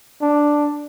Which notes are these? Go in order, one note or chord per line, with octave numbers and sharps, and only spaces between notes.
D4